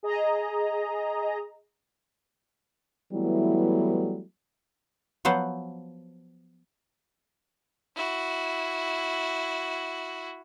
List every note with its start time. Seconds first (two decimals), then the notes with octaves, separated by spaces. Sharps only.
0.03 G#4 D#5 A#5
3.13 E3 F#3 G3 A3 B3 E4
5.25 F3 F#3 B3 C5 F#5
7.96 E4 F#4